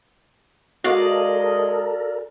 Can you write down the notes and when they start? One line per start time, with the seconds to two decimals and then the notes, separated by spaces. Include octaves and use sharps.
0.84 G#3 F#4 A4 A#4 D5 D#5 F5